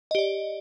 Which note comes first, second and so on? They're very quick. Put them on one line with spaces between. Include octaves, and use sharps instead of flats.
D#5 G4 D5